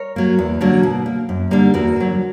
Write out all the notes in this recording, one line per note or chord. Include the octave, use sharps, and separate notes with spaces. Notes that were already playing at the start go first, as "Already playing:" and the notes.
Already playing: A#4 C#5
F#3 A#3
E2
D3 F#3 A#3
B2
A#3
F#2
D3 G3 A#3
E2 F#4 A#4
D3 F#3